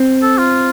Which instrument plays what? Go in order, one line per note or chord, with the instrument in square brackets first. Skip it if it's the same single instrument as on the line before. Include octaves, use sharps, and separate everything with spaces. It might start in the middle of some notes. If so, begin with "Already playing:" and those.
Already playing: [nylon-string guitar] C4
[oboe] A4
F4